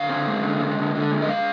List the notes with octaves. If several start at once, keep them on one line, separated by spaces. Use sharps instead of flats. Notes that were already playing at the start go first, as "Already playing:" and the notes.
Already playing: D3 F5
C4
G#3
D3
G#3
D3
D3
G#3
D#5
G#3 F5